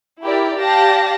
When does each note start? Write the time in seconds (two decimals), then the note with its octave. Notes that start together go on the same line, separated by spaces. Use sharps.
0.23 E4 G4 A#4 D5
0.58 G4 D5 F5 A5 A#6